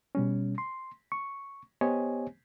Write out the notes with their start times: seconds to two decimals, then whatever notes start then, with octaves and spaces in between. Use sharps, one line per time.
0.15 B2 G3 C#4
0.58 C6
1.12 C#6
1.81 B3 G4 C5 C#5 D#5 G#5